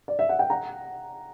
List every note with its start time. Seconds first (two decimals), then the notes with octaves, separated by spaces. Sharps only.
0.08 D5
0.19 E5
0.29 F#5
0.39 G5
0.50 F#5 A#5